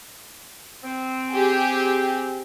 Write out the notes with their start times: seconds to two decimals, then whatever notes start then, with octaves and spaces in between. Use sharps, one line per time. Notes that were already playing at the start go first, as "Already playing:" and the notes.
0.83 C4
1.31 G4 G#4